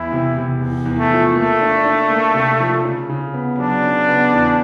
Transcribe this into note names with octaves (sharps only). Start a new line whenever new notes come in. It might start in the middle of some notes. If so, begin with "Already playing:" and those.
Already playing: E2 E4
C3
C3
E2
E2
A3
F3
A3 A#3
D4
D4
A#3
C3
F3
C#3
C#3
B3
F#3 D4
C#3
B3
E2